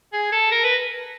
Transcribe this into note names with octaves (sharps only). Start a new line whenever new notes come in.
G#4
A4
A#4
B4